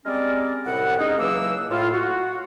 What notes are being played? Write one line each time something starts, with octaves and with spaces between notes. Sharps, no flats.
G3 G#3 C4 C#4 A#4 D5
C2 A2 F#5
G#3 C#4 D#4
C#2 E3 F#3 A#3 D4 E6
A2 F4
F#4